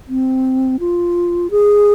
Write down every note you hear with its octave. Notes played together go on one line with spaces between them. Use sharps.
C4
F4
G#4